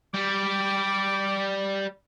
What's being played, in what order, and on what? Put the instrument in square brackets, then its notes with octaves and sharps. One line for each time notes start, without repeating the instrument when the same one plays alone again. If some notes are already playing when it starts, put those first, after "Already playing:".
[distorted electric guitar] G3 [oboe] D6